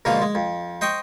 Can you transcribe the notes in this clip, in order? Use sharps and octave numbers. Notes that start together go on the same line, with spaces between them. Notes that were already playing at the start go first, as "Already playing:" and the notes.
G#2 B2 D3 F3 A#3 F4
G#3
F2
C5 D#5 G5 C#6